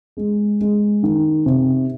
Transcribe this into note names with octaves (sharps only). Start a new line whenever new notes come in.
G#3
G#3
D#3
C3